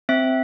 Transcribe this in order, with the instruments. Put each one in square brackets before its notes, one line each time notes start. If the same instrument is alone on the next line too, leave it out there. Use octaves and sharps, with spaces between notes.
[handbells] C4 E5